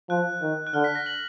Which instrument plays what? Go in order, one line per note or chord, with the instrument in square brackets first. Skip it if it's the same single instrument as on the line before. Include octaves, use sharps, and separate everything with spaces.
[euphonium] F3 [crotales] F#6
[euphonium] D#3
[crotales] F#6
[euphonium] D3 [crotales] F6
[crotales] B6
A#6
F#7